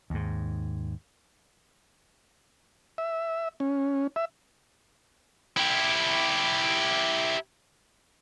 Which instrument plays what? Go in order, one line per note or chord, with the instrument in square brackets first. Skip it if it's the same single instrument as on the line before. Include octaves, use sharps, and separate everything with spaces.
[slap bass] D#2 G#2
[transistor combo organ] E5
C#4
E5
[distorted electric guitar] E4 G4